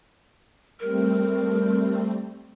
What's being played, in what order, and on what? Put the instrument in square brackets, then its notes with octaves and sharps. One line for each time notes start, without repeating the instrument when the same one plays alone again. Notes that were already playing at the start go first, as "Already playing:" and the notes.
[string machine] G3 A3 C4 [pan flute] A#4